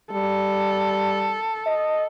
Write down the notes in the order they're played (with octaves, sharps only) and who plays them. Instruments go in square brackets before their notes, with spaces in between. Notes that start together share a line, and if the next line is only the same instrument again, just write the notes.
[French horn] G3 [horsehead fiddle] A4
[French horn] D#5